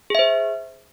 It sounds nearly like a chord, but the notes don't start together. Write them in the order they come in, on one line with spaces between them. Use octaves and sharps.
G#4 E5 C5